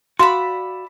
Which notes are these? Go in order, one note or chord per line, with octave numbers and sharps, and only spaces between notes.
F#4 D5 E5 F5 B5 C6